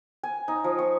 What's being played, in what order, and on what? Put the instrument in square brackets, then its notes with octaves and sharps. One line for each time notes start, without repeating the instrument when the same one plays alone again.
[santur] G#5
D#4
F3
C#6